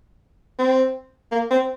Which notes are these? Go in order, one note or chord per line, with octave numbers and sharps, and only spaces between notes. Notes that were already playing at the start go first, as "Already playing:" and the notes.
C4
A#3
C4